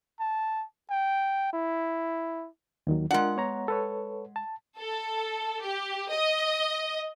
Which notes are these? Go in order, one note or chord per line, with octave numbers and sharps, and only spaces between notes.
A5
G5
E4
D#2 D#3 F#3
G#3 D4 F4 A#4 F#5
B3 C#5 A#5
A4 B4 C#5
A5
A4
G4
D#5